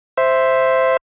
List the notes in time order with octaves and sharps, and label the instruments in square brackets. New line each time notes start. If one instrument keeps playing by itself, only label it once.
[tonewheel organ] C5 E5